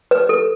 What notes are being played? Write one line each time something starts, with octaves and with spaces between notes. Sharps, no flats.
B4
A4